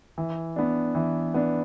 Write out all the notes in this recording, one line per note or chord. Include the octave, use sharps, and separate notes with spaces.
E3
B3 D4
E3
B3 D4